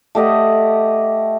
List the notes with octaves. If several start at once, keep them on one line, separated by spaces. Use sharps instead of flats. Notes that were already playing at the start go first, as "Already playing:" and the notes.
A3 G4 D#5 F#5